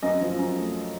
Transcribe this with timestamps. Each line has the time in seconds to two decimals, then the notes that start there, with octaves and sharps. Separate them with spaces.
0.02 F#2 D#5
0.21 F3
0.39 F#2
0.56 A3